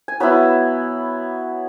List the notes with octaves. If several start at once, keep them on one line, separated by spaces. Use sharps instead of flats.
G#5
F#3 B3 E4 B5